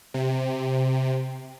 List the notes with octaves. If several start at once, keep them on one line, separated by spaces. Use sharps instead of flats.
C3